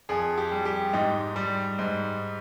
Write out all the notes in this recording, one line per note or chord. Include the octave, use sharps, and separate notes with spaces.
F2 G#4
G4
G3
G4
G#2 D#4
G3
G#2